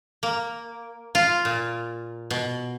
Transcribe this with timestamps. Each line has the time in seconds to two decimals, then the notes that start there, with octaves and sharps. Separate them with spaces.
0.23 A#3
1.15 F4
1.45 A#2
2.31 B2